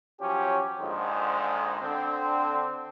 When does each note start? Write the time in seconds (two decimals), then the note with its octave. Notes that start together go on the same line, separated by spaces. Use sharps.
0.20 F3 F#3 C#4 G4
0.80 A#1 G#2 D3 D#3 F3 G#3
1.82 D3 C4